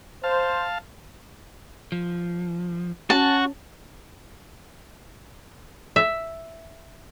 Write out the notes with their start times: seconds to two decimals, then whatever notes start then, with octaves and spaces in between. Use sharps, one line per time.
0.24 C5 F5 A5
1.92 F3
3.10 C#4 F#4 A5
5.96 E5